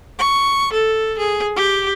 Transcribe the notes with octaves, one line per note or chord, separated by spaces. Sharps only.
C#6
A4
G#4
G4